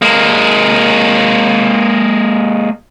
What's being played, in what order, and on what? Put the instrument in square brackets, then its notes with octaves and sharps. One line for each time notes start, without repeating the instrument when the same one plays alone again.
[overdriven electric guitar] G#3 A#3